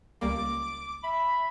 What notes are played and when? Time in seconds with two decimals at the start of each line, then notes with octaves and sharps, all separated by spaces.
0.21 C#2 G3 A#3 D6
1.03 E5 B5